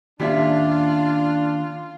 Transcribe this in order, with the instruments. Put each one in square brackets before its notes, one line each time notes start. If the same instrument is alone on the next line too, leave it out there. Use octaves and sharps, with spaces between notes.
[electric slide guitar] D#3 A#3 C#4 [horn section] D4 [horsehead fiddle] F4 [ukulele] G4 D5 E5